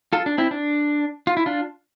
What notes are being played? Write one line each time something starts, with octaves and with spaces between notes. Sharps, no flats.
F4 A4
D4
C4 E4
D4
F4
E4
D4 F4